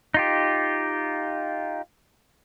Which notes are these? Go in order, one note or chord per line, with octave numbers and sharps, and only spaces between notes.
D#4 F4 G4